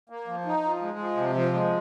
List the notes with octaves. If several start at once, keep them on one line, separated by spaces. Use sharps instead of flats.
A#3
F3
D#4
F3
G#3
F3
C3
F3
G#3